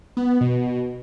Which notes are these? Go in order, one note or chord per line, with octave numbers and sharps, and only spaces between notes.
B3
B2